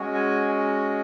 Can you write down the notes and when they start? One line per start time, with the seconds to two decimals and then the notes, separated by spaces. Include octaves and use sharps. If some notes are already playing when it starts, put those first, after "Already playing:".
Already playing: G#3 C#4 F#4
0.14 G#5